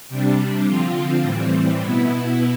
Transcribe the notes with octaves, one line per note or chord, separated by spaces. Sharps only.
C3 G3 D4
D3 F3 C4 F4
A2 E3 G3 C4
B2 B3 E4